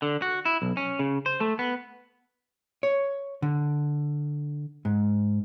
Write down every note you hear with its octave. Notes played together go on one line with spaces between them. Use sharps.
D3
F#4
E4
B1
C#4
C#3
C5
A3
B3
C#5
D3
G#2